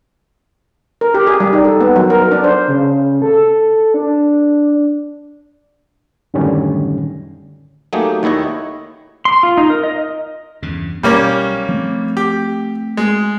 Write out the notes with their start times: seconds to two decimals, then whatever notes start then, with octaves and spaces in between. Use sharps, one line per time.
1.01 A#4
1.14 G4
1.27 G#4
1.40 G3
1.53 D#4
1.65 A4
1.81 B3
1.96 F#3
2.10 A#4
2.31 D4
2.44 C5
2.68 C#3
3.22 A4
3.94 D4
6.34 F#2 A2 D3 D#3 G3 C#4
7.93 F#3 A3 A#3 D#4 G4 G#4
8.23 D#2 D#3 E4 C#5 D#5
9.25 C6
9.43 F4
9.57 D#4
9.70 A#4
9.84 D#5
10.62 E2 G2 C#3
11.03 B1 G3 A#3 C#4
11.68 F3 A3 C4
12.17 G4
12.97 G#3